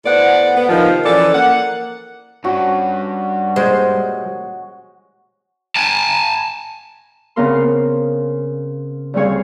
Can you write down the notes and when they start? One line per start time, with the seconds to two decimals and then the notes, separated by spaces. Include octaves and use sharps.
0.05 A2 B3 C5 D5 F#5
0.56 B3
0.69 C3 D#3 F3
1.05 E3 F3 C#4 A4 D5
1.34 A#3 F#5
2.44 G2 C#4 F#4
3.56 A#2 G3 G#3 C5
5.76 G#5 A5
7.36 C#3 B3 C4 A#4 F5 C6
9.14 D2 G3 C4 G#4 C#5 F5